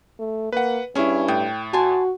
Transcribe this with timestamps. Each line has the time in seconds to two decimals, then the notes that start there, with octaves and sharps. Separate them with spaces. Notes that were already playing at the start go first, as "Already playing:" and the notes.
0.19 A3
0.52 A#3 B4 F#5
0.95 G2 C#4 E4 G#4 C#5
1.28 A2 G5 D#6
1.73 F#4 G#5 A5 C6